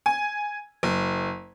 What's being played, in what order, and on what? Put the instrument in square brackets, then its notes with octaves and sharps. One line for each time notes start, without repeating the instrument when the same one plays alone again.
[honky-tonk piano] G#5
F#1